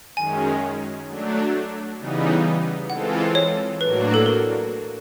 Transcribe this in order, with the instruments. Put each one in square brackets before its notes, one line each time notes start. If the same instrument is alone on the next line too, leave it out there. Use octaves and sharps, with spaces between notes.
[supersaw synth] F#2 D#3 G#3 C#4 [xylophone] G#5
[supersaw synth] F#3 A3 D4
C#3 E3 G3 B3 D#4
[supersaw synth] E3 G#3 C4 F4 A4 [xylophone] F#5
[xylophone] C#5
[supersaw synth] A2 F#3 A#3 D4 F#4 [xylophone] B4
[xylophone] A4
A#4